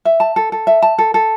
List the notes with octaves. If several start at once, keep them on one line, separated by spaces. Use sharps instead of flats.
E5
A5
A4
A4
E5
A5
A4
A4